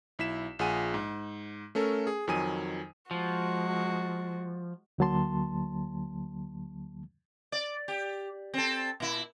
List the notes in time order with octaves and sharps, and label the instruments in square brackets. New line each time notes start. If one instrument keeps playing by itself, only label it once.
[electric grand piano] B1 E4 B6 E7
A#1 F4 G#4 F#5 G#5 D#7
G#2
A3 C#4 A4 A#4
G#4
F2 D#3 F#3 G#5 D#6 D#7
[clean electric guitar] F3 [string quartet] G#3 F#4
[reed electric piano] D2 D3 F#3 A#3 A5 C6
[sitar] D5
G4
C4 A4
A#2 E4